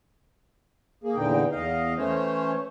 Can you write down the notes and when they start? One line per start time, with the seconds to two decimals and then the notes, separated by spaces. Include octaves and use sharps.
1.04 A#3 G#4
1.16 E2 A#2 D3 E3 D#4 G5
1.52 E2 D#5 F5
1.97 E3 A3 C#4 C5 C#5